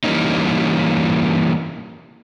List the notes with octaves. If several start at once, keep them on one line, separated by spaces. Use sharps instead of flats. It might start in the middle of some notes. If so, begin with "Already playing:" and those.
E3 G3 G#3 A#3 C#4 D#4